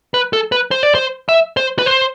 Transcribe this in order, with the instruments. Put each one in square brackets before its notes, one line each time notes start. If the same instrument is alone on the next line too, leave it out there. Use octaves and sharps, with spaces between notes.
[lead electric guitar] B4
A4
B4
C5
D5
C5
E5
C5
B4
C5